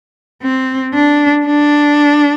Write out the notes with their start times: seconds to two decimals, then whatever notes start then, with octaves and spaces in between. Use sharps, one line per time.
0.43 C4
0.94 D4
1.46 D4